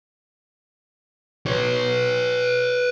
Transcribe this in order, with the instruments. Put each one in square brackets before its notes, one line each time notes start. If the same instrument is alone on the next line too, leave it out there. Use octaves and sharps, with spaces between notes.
[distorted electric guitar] B4 C#5